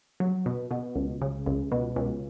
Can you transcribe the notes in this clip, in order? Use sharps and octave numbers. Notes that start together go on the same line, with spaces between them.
F#3
B2
B2
C#2
C#3
C#2
B2
C#2